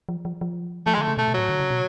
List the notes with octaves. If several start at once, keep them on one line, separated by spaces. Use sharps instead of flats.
F3
F3
F3
F3 A3
G#3
D3 A3
C#3
B2 A3
B2
A2 F#3
D3
C#3
B2